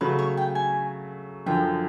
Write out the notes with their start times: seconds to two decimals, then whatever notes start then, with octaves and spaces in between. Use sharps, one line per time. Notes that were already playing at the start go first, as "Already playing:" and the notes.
0.01 C#3 F#3 A3 B4
0.19 C#5
0.37 G5
0.55 G#5
1.46 F#2 D3 F3 G5